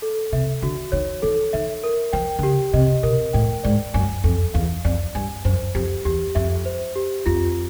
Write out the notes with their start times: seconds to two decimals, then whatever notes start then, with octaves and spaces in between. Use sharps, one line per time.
0.02 A4
0.32 C3 E5
0.62 D3 F#4
0.92 D#3 C#5
1.22 D#3 A4
1.53 D#3 E5
1.84 A#4
2.13 F3 G5
2.39 D3
2.43 C#3 G4
2.73 C3 D#5
3.03 B2 A#4
3.33 A2 G5
3.63 G#2 D5
3.94 F#2 G#5
4.24 F2 A4
4.54 E2 F5
4.84 F2 D5
5.15 G2 G#5
5.45 F#2 C5
5.75 F2 G4
6.05 E2 G4
6.35 F2 E5
6.65 C5
6.96 G4
7.26 F2 F4